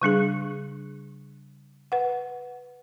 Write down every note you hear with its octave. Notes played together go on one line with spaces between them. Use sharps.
C#3 G3 D4 G#4
B4 F#5